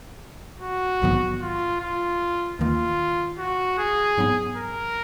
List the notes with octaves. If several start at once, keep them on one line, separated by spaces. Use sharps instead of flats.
F#4
A#1 G#2 D#3 F#3 B3
F4
F4
D#2 D#3 A#3 F4
F#4
G#4
G#2 F#3 B3
A#4